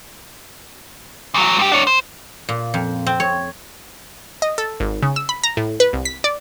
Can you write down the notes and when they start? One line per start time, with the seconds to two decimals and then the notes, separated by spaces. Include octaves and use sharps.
1.34 E2 F#3
1.59 G2 G4
1.72 D4 C#5
1.87 C5
2.49 A#2
2.74 F2
3.06 C4
3.20 C#5
4.42 D#5
4.58 A4
4.80 G#1
5.03 C#3
5.16 E6
5.29 B5
5.44 A#5
5.57 A2
5.80 B4
5.93 C2
6.05 B6
6.24 D5